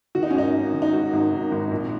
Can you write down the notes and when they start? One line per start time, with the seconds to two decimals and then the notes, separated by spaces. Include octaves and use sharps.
0.15 D#3 F#4
0.23 D#4
0.30 C#4
0.35 G#1 D#4
0.54 G#2
0.74 D#3
0.82 D#4
0.93 G#2 F#4
1.13 G#1
1.32 D#3
1.51 G#1
1.71 A#1